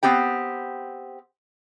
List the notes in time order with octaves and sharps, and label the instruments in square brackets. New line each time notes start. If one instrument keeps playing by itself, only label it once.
[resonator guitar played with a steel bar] B3 C4 G4 G5